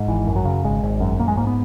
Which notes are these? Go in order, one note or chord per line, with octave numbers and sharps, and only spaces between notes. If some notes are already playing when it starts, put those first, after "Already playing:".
Already playing: G#2
G#1 E3
F#2
F#3
C#3
G#1 G#3
G#1
F#2
A#1 A#3
G#3
G#2 A#3
B3